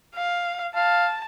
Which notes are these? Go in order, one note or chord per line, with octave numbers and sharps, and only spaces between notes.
F5
F5 A5